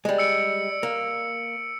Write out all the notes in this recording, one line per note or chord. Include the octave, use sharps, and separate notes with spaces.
G3 G#3
E6 C#7 D7
A#3